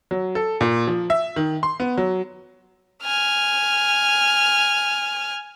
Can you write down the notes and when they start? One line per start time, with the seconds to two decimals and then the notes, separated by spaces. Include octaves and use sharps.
0.11 F#3
0.35 A4
0.61 A#2
0.87 F3
1.10 E5
1.36 D#3
1.63 C6
1.80 B3
1.97 F#3
3.03 G#5 F6